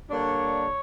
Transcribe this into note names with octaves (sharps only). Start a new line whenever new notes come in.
D3 G3 A#3 D4 C#5